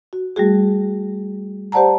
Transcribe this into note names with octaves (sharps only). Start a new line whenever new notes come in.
F#4
G3 A3 F#4 G#4
G4 C5 D5 F#5 A5 A#5